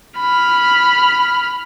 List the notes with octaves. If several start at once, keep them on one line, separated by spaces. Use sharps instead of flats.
B5 F6